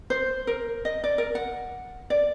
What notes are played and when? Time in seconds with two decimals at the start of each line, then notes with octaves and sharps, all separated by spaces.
0.10 C5
0.47 A#4
0.85 D#5
1.04 D5
1.18 A#4
1.35 F#5
2.10 D5